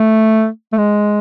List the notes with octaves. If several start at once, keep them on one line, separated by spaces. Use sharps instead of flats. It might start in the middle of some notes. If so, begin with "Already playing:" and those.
Already playing: A3
A3
G#3